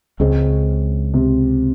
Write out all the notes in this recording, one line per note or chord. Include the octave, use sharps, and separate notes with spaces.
C#2 C#3 G#3 C4
C3